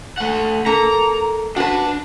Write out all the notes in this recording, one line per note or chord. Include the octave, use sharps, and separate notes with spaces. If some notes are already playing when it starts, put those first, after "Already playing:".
A3 F#5
A#3 A4 A#5
D4 F#4 B4 A5